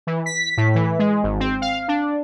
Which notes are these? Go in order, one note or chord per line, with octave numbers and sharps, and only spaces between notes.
E3
B6
A2
E3
G#3
G#1
C4
F5
D4